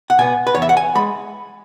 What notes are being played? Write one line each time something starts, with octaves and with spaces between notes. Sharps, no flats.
F#5
B2 B3 G#5
B4
E2 C#5
E5
F#5
G#5
G#3 B5